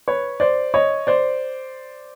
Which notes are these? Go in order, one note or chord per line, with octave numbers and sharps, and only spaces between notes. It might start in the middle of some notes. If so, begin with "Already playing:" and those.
B4 C#5
C5 D5
C#5 D#5
C5 D5